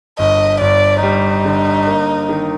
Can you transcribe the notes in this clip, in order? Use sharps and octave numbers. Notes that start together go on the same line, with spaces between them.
G1 D#5
G1 D5
G3 D#4
D3
A#3
D#3